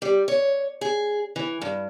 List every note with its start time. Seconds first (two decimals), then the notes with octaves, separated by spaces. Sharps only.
0.02 G3
0.28 C#5
0.81 G#4
1.36 E3
1.62 G2